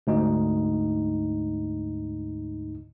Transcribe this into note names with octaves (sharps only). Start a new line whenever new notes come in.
D2 G#2 D#4